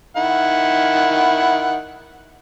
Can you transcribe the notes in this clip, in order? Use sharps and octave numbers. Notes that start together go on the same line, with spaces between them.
D#3 E4 F#5